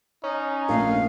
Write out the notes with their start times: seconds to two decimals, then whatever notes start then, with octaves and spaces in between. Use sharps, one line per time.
0.24 C#4 D#4
0.69 A#1 A3 F5